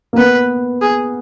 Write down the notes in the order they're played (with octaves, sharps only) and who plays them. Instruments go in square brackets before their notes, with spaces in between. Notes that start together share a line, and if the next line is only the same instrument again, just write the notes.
[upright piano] A#3
[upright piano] B3 [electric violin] B4
[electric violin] G#4